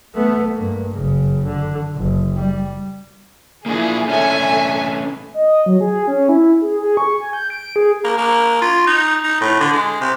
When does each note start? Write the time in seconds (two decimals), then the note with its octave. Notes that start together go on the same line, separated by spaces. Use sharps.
0.14 A3 B3
0.54 G2 A#3
0.92 F#1 C#3
1.45 D3
1.95 F#1
2.37 G3
3.66 A#3 D4 E4 F4 G#4
4.09 A3 C#4 D4 A4 E5 G#5
5.34 D#5
5.66 F#3
5.81 G#4
6.08 C#4
6.29 E4
6.62 G#4
6.82 G#4
6.97 C#6
7.21 G#5
7.33 G6
7.50 D7
7.76 G#4
8.04 A#3
8.17 A#3
8.62 F4
8.86 D#4
9.24 D#4
9.41 A2
9.60 D3
9.73 G#3
10.00 C3